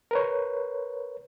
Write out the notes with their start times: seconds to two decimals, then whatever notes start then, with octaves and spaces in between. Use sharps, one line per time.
0.11 A#4 B4 C#5